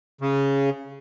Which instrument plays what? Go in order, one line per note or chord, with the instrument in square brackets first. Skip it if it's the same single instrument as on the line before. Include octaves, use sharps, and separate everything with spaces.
[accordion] C#3